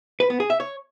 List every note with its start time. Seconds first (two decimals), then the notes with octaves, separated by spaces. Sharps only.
0.20 B4
0.30 B3
0.40 G#4
0.50 E5
0.60 C#5